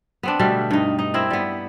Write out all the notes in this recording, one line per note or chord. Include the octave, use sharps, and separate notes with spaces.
B3 C4 D4
B2 D3 G3 A3
G2 D#4
D#4
C4 E4 A#4
G3 B3